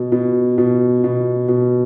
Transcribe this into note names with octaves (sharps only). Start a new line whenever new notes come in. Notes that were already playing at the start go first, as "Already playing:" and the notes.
Already playing: B2
B2
B2
B2
B2